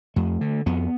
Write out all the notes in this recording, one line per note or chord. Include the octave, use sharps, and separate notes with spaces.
F2 A3
D3
F2 B3